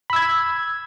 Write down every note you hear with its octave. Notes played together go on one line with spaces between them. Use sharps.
B5 E6 G#6